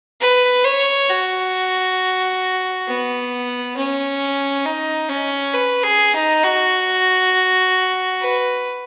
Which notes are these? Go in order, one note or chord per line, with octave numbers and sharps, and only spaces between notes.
B4
C#5
F#4
B3
C#4
D#4
C#4
B4
G#4
D#4
F#4
B4